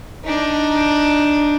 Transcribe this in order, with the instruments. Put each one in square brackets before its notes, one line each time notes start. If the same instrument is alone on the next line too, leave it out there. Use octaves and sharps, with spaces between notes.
[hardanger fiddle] D4 D#4